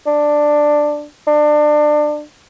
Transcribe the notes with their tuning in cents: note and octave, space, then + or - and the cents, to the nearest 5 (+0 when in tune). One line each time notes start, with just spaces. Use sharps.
D4 +10
D4 +25